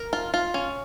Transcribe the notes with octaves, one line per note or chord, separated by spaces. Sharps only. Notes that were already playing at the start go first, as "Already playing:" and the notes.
Already playing: A#4
F4
F4
C#4